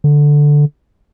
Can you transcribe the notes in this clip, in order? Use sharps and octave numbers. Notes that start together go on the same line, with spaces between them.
D3